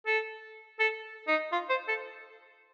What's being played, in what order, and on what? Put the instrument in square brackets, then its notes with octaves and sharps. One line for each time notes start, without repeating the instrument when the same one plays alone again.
[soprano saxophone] A4
A4
D#4
F4
C5
A4